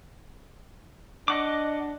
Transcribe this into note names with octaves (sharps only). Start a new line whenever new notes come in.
D4 D#5 F#5 D6